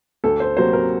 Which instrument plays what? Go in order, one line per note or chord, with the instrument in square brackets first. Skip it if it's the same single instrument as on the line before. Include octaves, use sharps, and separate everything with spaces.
[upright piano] D2 A4
C5
C3 F#3 A#3 C5
A#4